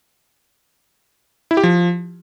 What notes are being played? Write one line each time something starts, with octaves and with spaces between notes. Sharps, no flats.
E4
G4
F3